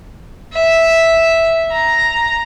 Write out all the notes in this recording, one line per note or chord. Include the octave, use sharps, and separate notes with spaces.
E5
A#5